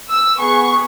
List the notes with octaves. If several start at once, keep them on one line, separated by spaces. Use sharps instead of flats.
E6
B3 G#4 C#6